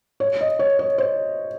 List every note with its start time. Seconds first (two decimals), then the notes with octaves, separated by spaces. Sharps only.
0.20 C#5
0.41 D#5
0.59 C#5
0.79 C#5
0.98 C5